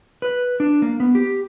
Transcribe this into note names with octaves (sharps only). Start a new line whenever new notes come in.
B4
D4
A#3
B3
G4